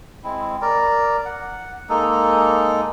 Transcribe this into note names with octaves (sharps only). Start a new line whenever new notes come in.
G#3 C4 E4
A#4 D5
F#5
G#3 A#3 D#4 A4